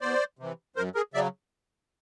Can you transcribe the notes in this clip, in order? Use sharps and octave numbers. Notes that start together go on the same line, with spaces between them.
E2 C5 D5
C3 E3
F#2 A#4 C5
G#4 A#4
C#3 F#3 D5 E5